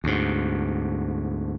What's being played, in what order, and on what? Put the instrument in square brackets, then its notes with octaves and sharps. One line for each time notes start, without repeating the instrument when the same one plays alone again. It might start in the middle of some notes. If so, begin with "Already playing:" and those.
[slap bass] D2 G#2